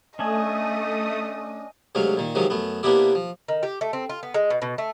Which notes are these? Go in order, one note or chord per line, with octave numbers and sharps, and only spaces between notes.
A3 C#4 D4 D#5 G#5 D#6
D2 C3 F#3 G#3 F5
A#2 D#3
C3 D#3 F3 F#3 G#3
F#2 A3 B3
C3 A#3 B3 D4 E4 G4
F3
D#3
G4
A3
C4
F4
B3
G#3
B2
B2
A3